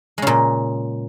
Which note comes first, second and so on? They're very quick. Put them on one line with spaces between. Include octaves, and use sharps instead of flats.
G#3 C#3 A#2